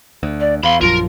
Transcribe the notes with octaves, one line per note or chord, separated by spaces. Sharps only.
D2
D5
E2 F5 B5 C6
A#1 F#2 F3 F4 A#4